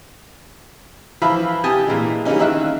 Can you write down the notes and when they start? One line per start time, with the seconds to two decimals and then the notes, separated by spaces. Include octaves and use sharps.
1.22 E3 F3 E5 F5 B5
1.64 C3 G4 G#5 A5 D#6
1.87 A#2 E3 G#3
2.25 E3 G3 G#3 A#3 C#4 D#4
2.39 D#3 D#4 E5 F5 E6 F#6